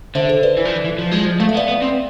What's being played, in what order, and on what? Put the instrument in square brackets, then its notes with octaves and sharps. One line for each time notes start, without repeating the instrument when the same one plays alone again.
[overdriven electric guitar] D3 [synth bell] C5 E5
[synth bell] A4 C5
B4 D5
[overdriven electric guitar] E3
F3
E3
E3
F3
G#3
F3
[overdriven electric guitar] A3 [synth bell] F5
[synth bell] E5
[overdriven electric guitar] B3
[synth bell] D5 F5
[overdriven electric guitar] B3
C4